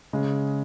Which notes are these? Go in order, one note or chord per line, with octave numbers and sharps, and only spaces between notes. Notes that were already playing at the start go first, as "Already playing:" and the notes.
C#3 G#3